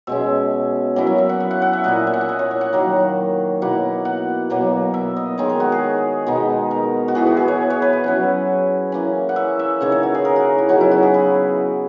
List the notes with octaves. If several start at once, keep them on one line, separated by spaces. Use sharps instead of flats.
B2 G#3 C#4 E5
F#3 A#3 C#4 E4
E5
E5
F#5
E5
F#5
F#5
E5
A#2 A#3 E4 D#5
E5
F#5
E5
D#5
C#5
E5
F#5
D#3 F#3 A#3
B2 F#3 A#3 E4 F#5
F#5
B2 F#3 A#3
E5
D#5
D#3 G#3 D#4 C#5
A#4
F#4
G#4
B2 G#3 B3 D#4
A#4
F#4
E3 B3 E4 G#4
F#4
G#4
C#5
C#5
B4
F#5
F#3 C#4 E4
E3 A#3 C#4
F#5
E5
E5
C#3 E3 A#3 D#4 C#5
C#5
F#4
G#4
A#4
F#4
E4
C#3 F#3 B3 D#4 F#4
E4
F#4
G#4
B4